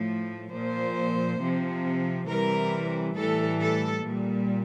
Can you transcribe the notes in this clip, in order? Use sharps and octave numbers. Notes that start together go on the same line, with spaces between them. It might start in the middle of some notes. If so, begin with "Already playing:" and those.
Already playing: A2 F3
A#2 F3 C5
C3 F3
C3 E3 G3 A#4
A2 E3 G3 A4
A4
A#2 G3